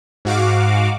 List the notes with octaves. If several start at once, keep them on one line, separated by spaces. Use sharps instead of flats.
G#2 F#4 F5 D6